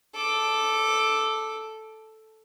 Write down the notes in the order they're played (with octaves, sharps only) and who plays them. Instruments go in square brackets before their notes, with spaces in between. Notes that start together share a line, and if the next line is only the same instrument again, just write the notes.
[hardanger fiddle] A4 D6